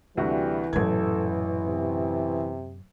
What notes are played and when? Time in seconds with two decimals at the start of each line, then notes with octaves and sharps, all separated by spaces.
0.17 D2 C3 E3 G3 F#4
0.73 A1 F#2 A#2 A4 G#6
1.67 C3